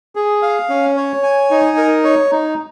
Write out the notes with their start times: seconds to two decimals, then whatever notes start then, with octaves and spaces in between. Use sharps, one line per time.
0.15 G#4
0.42 F5
0.69 C#4
0.97 C#5
1.23 G#5
1.51 D#4
1.77 A#4
2.04 C#5
2.31 D#4